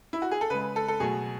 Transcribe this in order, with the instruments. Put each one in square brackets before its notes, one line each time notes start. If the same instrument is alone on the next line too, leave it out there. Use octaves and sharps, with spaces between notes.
[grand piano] E4
F#4
G#4
A4
C#3 G#3 B4
A4
A4
B2 F#3 A3 G#4